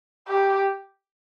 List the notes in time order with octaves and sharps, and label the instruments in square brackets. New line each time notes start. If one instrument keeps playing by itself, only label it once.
[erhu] G4